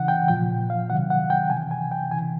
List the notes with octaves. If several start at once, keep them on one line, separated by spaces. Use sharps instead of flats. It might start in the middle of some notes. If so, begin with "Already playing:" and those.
Already playing: C#3 E3 F#5
G5
A#2 F3 G5
F5
C3 D#3 F#3 F#5
F#5
G5
C3 E3 G#5
G#5
G5
C#3 E3 G#5